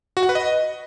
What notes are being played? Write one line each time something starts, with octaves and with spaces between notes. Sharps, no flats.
F#4
F#5
B4
D#5